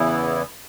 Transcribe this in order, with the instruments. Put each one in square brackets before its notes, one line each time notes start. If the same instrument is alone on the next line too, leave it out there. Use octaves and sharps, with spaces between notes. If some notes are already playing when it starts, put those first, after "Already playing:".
Already playing: [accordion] E2 C#3 E3 B3 E4